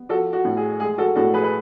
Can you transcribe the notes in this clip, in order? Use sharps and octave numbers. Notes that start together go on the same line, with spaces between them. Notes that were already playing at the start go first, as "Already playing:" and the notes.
Already playing: B3
F3 F#4 A4
F#4
A2
G#4
G#3 G#4
F#4 A4
A2 F#4 A4
G#4 B4
B4